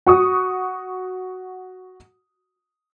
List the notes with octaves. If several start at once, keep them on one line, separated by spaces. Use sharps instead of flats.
F#4 C#6 D#6